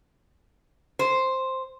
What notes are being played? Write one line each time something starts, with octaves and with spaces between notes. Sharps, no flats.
C5